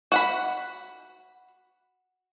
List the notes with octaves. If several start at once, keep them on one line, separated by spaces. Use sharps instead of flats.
F#4 F#5 B5